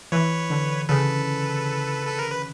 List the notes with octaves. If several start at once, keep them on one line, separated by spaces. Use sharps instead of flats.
E3 B4 C#5
D3
C#3 A4 B4
A4
A#4
B4